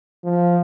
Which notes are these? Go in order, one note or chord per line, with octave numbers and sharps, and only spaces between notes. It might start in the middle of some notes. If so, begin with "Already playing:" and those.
F3